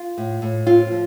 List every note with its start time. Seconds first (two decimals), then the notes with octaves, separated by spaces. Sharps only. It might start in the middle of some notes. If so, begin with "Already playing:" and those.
Already playing: F4
0.18 A2
0.42 A2
0.67 C4 F4
0.91 F3